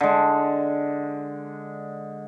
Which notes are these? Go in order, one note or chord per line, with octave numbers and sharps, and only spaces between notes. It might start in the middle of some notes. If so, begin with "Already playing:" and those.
D3 G#3